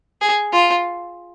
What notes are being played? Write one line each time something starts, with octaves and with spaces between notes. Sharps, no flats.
G#4
F4